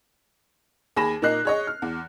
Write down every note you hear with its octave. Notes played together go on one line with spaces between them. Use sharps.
D#2 G#4 G#5 B5 A#6 E7
A#2 A#3 D#4 D#5 F#6 C7
G#4 C#5 D#5
F6
E2